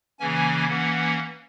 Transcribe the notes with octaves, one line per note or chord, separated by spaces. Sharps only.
C#3 E3 A#3 C#4 G#5
E3 A#3 C#4 F#5